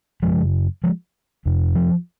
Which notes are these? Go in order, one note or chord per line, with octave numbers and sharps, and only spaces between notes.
F#2 C#3 F3 G#3
F3 G#3
F2 C3
F3